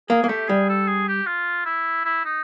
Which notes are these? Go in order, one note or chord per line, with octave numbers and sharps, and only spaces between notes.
A#3 G#4
A#3
A3 G4
G3 G#4
A4
G#4
G4
F4
E4
E4
D#4